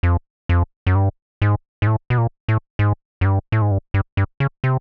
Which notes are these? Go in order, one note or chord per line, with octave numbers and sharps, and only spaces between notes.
F2
F2
F#2
G2
G#2
G#2
A2
B2
A#2
A2
G#2
F#2
G2
A2
G#2
G2
G2
G2
C#3
C3